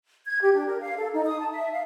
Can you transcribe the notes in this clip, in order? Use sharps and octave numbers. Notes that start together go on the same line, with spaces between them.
G#6
G4
D4
A#4
F5
A4
D#4
D#6
A5
E5
F5